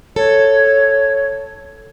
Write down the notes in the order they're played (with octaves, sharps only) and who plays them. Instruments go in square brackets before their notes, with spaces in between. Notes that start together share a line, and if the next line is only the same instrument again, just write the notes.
[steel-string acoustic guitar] A4 [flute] C#5